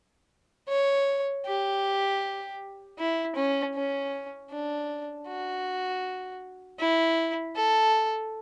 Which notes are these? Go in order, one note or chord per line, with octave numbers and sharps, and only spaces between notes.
C#5
G4
E4
C#4
C#4
D4
F#4
E4
A4